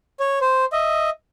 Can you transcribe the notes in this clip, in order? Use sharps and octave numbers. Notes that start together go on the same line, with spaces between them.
C#5
C5
D#5 E5